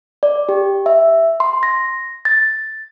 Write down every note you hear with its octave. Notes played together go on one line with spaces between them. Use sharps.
D5
G4
E5
C6
A#6
A6